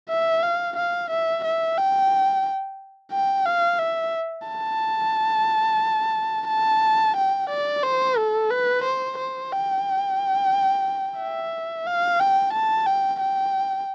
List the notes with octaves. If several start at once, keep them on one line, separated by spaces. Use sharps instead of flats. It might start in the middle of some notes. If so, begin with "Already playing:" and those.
E5
F5
F5
E5
E5
G5
G5
F5
E5
A5
A5
G5
D5
C5
A4
B4
C5
C5
G5
E5
F5
G5
A5
G5
G5